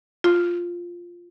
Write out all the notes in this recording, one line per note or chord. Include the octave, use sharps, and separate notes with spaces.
F4